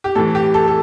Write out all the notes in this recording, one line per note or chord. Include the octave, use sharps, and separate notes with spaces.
G4
A2 E3 A4
G4
A4
A4